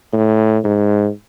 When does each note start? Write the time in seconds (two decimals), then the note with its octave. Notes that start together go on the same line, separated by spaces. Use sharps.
0.13 A2
0.64 G#2